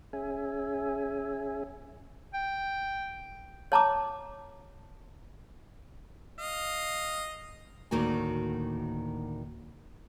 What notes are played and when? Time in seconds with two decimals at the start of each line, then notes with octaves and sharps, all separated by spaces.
0.13 C#4 G#4 E5 G#5
2.34 G5
3.72 C#5 A5 A#5 D6
6.38 D#5 F5
7.91 D2 A2 D#3 A#3 F#4 G#5